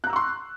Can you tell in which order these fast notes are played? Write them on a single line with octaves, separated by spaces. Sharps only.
F#6 A#5 E6 C#6 C6